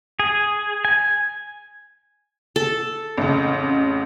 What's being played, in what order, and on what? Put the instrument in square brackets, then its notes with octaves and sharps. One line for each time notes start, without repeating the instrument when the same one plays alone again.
[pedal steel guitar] G#4
G#5
[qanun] A4
[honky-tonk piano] A1 F2 C#3